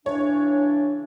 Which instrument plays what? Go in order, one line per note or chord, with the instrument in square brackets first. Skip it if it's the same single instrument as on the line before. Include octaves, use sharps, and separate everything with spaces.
[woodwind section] C#3 E3 D4 [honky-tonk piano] C#5